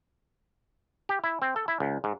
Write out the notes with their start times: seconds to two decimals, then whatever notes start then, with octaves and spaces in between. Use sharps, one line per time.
1.09 G4
1.24 E4
1.42 C4
1.56 A4
1.68 E4
1.80 C#2
2.04 G#2